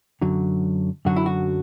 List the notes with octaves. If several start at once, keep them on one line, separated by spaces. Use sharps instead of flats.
F#2 D3 F#3
F#2 D3 F#3 F#4
E4
F#4